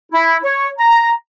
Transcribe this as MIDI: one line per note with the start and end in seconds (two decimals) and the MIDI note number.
0.12 0.37 64
0.44 0.68 73
0.78 1.09 82